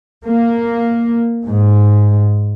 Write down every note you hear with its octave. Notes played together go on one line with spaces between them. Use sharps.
A#3
G#2